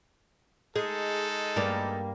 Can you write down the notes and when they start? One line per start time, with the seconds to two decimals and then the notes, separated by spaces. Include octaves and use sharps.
0.76 G#3 D#4 G#4 A4
1.56 G2 G3 A#3